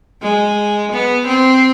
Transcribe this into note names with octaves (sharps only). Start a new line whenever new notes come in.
G#3
B3
C4